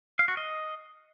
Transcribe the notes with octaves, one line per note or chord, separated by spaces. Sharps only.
F5
F#4
D#5